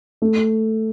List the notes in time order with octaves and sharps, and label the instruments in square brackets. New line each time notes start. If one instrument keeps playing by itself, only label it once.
[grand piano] A3